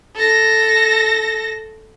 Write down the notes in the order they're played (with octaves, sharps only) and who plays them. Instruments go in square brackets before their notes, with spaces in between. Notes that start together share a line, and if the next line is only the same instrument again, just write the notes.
[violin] A4 A#6